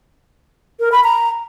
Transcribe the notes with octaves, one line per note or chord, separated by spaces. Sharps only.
A#4
B5
A#5